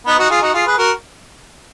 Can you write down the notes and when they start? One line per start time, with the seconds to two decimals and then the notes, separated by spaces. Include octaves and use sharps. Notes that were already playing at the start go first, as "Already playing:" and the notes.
0.06 B3 D#4
0.19 D#4 F#4
0.30 F4 G#4
0.42 D#4 F#4
0.54 F4 G#4
0.66 G#4 B4
0.78 F#4 A#4